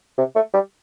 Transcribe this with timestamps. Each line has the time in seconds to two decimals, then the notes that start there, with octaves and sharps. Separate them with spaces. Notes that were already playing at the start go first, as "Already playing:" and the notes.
0.18 C3
0.36 A3
0.54 G3